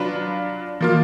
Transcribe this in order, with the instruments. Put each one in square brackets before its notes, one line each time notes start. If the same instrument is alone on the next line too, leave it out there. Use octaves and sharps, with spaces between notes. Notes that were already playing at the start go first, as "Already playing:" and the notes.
Already playing: [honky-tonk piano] F#3 D4 F4 B4
F3 A#3 F4